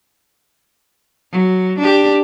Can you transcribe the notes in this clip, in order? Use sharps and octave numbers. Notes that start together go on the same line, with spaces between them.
F#3
D4 G4